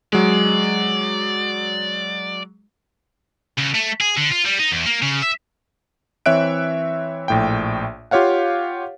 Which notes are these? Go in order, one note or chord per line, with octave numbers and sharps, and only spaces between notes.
F#3 G#3 D5
C#2
A3
G#4
D3
F4
G3
D#4
E2
A#3
C#3
E5
E3 C4 C#5 E5 F#6 D7
A#1 A2 G5
F4 G4 C#5 F5 F#5